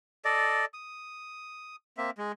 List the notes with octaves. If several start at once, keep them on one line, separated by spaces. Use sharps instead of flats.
A4 D5 D#5
D#6
A#3 C4 E5
G#3